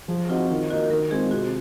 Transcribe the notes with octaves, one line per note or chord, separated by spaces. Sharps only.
F3 G#4
C4 D#4 F4 F#4
D#3 F4
A#3 D#4 F#4
D#3 A#4
G#3 C4 F4 G#4
C3 F#4